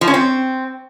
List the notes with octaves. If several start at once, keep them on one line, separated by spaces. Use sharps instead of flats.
F3
C#4
C4